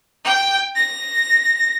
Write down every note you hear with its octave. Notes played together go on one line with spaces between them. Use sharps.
G5
A#6